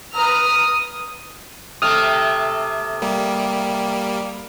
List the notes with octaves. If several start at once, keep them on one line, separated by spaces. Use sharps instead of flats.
B4 A#5 D#6 F6
C3 A3 D#6 F6
G3 A#3